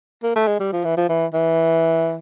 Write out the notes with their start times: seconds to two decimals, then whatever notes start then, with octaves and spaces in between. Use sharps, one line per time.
0.23 A#3
0.36 A3
0.47 G#3
0.60 G3
0.73 F3
0.84 E3
0.97 F3
1.09 E3
1.33 E3